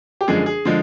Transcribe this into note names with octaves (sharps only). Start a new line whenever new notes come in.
G4
F#2 D3 F3 G#3 G#4
G#4
D3 F3 G#3